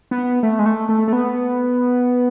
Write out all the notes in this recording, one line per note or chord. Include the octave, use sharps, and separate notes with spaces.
B3
A3
G#3
A3
A3
A3
B3